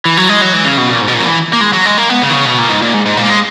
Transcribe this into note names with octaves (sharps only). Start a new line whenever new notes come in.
E3
F#3
G#3
F#3
E3
C#3
B2
A#2
G#2
B2
A#2
F#3
E3
A#3
G#3
F#3
G#3
A#3
B3
C#3
D#3
C#3
B2
A#2
G#2
A#2
G#2
G#2
A#2
A#3
G#3